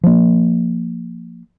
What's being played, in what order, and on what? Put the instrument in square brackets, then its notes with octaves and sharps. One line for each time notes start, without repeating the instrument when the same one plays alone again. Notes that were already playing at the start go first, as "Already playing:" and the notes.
[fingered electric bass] F3 A#3